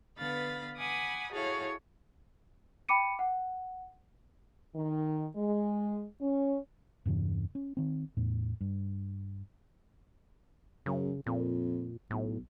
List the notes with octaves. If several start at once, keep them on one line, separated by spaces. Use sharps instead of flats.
D3 B3 B4 F5 B5 A6
F#5 G#5 B5 D6 D#6
E4 F#4 G#4 A4 C#5 F5
G5 B5 D6 C#7 D#7
F#5
D#3
G#3
C#4
E2 G2 C3 E3
C#4
D#3 C4
E2 A2
G2
F#2 C#3
F2 A#2
B1 A2